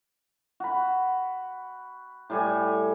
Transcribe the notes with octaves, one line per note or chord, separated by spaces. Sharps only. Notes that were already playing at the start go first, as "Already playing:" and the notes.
F#4 B5
A2 G3 G#5